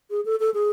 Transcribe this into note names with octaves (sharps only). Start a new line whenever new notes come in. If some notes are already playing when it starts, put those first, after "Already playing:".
G#4
A4
A4
G#4